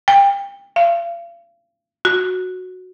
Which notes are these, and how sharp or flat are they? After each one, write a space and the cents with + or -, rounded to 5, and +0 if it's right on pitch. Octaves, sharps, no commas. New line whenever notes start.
G5 +30
F5 -40
F#4 -5